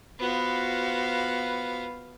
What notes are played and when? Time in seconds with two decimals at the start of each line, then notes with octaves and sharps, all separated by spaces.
0.19 B3 F4 F#4 C5 F5